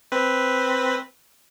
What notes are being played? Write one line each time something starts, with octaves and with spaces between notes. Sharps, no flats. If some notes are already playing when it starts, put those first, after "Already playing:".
C4 B4